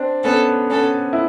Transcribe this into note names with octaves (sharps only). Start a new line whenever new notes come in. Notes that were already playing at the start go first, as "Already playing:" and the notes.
Already playing: C4 D4
B3 C#4 A4
B3 C#4 A4
E4